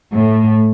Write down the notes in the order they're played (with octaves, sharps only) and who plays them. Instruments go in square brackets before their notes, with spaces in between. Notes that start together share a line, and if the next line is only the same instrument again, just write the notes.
[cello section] A2